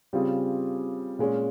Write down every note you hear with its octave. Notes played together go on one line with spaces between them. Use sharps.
C#3 G3 C4 F4 G#4
A#2 G#3 C#4